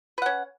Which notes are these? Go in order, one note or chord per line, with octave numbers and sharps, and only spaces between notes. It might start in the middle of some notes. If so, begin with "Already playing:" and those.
C#4 B4 F#5